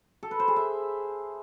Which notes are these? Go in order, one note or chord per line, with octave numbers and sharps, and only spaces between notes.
A4
B4
C5
G#4
E5